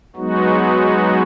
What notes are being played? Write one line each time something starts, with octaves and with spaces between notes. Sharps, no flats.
F#3 G#3 B3 D#4 F#4